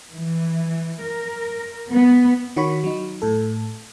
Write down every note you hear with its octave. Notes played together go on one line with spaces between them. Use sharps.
E3
A#4
B3
D#3 F#4 C#5 B5 C#6
F#3 D#4
A2 A4